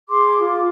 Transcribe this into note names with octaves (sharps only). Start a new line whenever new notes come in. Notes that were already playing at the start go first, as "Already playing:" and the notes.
G#4 C6 D6
F4